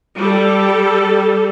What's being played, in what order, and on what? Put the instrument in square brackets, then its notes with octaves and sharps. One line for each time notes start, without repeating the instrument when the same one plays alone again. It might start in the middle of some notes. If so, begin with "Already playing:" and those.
[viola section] G3 A4